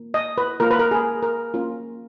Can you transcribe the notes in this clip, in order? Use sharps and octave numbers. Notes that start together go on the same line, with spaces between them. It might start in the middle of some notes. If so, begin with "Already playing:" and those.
Already playing: A#3
D#5
B4
A#3 F4 A#4
B4
A#4
G#4
A#4
A#3 C#4 F4